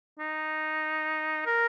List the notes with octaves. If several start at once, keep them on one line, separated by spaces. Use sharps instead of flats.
D#4
A#4